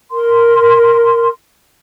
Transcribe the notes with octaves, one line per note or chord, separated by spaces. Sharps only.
A#4 C6